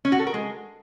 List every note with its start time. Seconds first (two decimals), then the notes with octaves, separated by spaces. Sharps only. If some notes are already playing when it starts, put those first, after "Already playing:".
0.05 C#4
0.12 F#4
0.19 A4
0.27 A#4
0.34 G#3